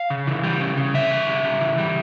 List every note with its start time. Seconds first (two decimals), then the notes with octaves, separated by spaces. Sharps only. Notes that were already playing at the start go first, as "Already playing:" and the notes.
Already playing: F5
0.10 C#3
0.27 E3
0.44 G3
0.60 C#3
0.77 C#3
0.94 E3 E5
1.11 G3
1.27 C#3
1.45 C#3
1.61 E3
1.78 G3